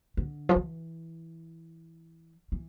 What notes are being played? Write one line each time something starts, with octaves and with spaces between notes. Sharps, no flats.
D3
F3
E3
E3